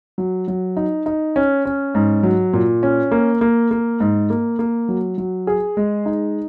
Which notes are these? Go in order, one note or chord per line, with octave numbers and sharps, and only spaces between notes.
F#3
F#3
D#4
D#4
C#4
C#4
G#2
F#3
A#2
C#4
A#3
A#3
A#3
G#2
A#3
A#3
F#3
F#3
G#4
G#3
D#4